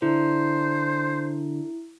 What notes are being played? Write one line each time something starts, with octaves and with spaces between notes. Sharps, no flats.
D3 E4 C5